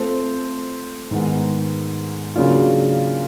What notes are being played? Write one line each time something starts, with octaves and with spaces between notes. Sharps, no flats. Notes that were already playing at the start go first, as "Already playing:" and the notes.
Already playing: A3 C4 F4 A4 C5
G#2 D#3 G#3 B3
C#3 F#3 A#3 D4 F4